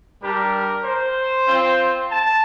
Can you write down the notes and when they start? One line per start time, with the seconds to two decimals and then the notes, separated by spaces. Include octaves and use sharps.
0.21 G3 D4 G4 A#4
0.83 C5
1.46 C4 F4
2.08 A5